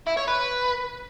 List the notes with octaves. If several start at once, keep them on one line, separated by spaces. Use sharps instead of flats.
E4
C#5
B4